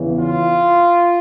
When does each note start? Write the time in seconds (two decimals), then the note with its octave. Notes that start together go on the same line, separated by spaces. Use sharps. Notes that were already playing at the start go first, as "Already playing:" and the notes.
Already playing: E2 C#3 E3
0.17 F4